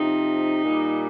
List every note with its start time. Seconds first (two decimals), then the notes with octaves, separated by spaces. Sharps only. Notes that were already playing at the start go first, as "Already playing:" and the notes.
Already playing: C3 F3 D#4
0.64 A#2 G3